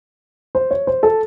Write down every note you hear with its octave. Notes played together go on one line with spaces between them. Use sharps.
C5
C#5
C5
A4